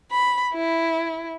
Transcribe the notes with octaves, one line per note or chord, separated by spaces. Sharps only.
B5
E4